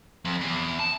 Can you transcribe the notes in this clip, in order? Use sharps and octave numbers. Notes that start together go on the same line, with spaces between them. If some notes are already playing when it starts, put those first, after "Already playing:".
F2
E2
A5